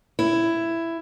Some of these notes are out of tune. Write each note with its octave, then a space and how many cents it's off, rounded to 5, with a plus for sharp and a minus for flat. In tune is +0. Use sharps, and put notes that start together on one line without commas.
E4 +10